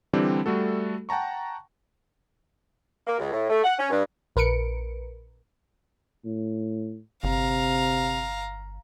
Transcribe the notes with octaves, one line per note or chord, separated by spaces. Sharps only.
D3 E3 G3 C4 D4 G4
G3 A3 F#4 A4
F#5 G5 A5 A#5 C#6
A#3
C#2
A2
A3
F#5
C#4
G2
A#1 A#4 B4 C#7 D7
A2
G1 C3 F5 A#5